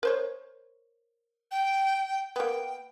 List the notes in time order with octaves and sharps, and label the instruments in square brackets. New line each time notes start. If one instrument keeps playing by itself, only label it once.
[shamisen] A#4 C5 C#5
[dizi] G5
[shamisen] A#3 B3 [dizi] G5